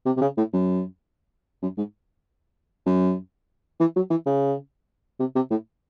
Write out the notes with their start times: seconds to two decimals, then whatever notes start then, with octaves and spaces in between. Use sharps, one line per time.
0.06 C3
0.17 C3
0.21 C#3
0.37 A2
0.53 F#2
1.62 F#2
1.77 G#2
2.86 F#2
3.80 E3
3.96 F#3
4.10 E3
4.26 C#3
5.19 C3
5.35 C3
5.50 A2